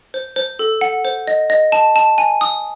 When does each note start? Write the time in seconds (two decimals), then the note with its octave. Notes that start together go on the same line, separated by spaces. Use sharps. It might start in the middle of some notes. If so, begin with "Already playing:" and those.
0.14 C5
0.36 C5
0.59 A4
0.81 F#5
1.05 C5
1.27 D#5
1.50 D#5
1.72 A5
1.96 A5
2.18 G#5
2.41 D#6